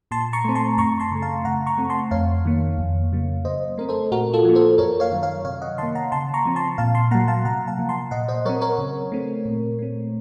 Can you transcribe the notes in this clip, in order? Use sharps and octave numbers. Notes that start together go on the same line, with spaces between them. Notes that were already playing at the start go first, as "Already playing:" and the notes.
A#2 A5 C6
A#5 C#6
A3 C4
A5 C6
F#2 A#5 C#6
A5 C6
C#3 A3
F5 A5
C#3 F#5 A#5
A#5 C#6
A3 C4
A5 C6
F2 C#5 F5
D#3 A#3
F2
C#3 F#3 A#3
C#3 C5 D#5
A3 C4 A#4
A4 C5
A#2 F#4 A#4
F4 A4
F3 A#3
A4 C5
F#2 A#4 C#5
C#5 F5
D#3 F#3
C#5 F5
C3 C#5 F5
D#5 F#5
D#3 A#3 A5 C6
F#5 A#5
C#3 A5 C6
A#5 C#6
F3 C4
A5 C6
A#2 F5 A5
A5 C6
F#3 A#3 F#5 A#5
F5 A5
C3 F#5 A#5
F5 A5
F3 A#3
A5 C6
A#2 D#5 F#5
C5 D#5
F#3 C4 A#4 C#5
A#4 C#5
C#3
A3 C4
A#2
A3 C4